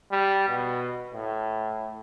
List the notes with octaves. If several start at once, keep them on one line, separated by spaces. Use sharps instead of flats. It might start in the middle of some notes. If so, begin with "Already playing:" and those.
G3
B2
A2